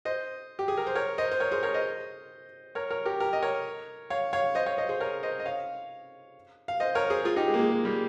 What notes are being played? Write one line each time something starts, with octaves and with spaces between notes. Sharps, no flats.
C5 D#5
G4
G#4
A#4
C5
A#4 C#5
C5 D#5
C5
A#4 C#5
G#4 C5
A#4 C#5
C5 D#5
A#4 C#5
A#4 C#5
G4 A#4
G4 A#4
D#5
A#4 C#5
C#5 F5
C#5 F5
C5 D#5
C#5 F5
C5 D#5
G#4 C5
A#4 C#5
C5 D#5
D#5
C#5 F5
F5
C5 D#5
A#4 C#5
G#4 C5
F4 G#4
D#4 G4
G#3
A#3
G#3
G#3
G3 A#3